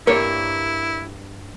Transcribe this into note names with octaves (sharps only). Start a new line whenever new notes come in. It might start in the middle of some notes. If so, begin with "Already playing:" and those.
G2 A#3 E4 C#5